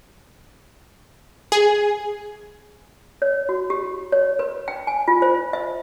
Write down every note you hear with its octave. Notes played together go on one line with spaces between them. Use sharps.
G#4
C#5
F#4
G4
C#5
B4
G5
G#5
F4
C5
E5